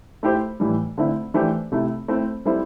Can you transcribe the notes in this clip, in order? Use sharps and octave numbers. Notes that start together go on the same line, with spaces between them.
A3 E4 G4 C5
A2 E3 G3
D3 A3 C4 E4
E3 A3 D4 G4 C5
C3 A3 E4
A3 C4 E4
G3 C4 E4 A4 C5